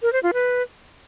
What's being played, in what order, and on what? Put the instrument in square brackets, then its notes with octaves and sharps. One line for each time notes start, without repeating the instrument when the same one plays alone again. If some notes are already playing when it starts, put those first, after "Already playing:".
[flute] A#4
C5
F4
B4